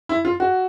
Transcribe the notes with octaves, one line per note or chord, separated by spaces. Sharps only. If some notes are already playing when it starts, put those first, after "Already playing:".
E4
F4
F#4